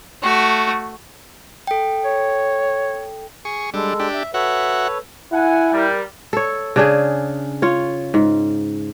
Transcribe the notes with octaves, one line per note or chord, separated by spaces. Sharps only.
A3 F#4
A4 G5
C#5
G#4 C#6
G3 G#3 D4 A4
D4 G4
E5
F#4 A4 B4 C#5 E5 F#5
E4 F#5 G#5
G3 A#4
A4 C#5
C#3 D4 G#4
F4 C#5
G#2